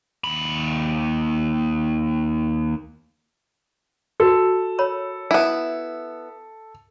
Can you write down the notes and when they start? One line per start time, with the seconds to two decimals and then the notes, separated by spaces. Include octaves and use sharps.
0.24 D#2 B5
4.20 F#4 A4
4.79 A#4 C#5 B5
5.31 B3 E4 E5 A5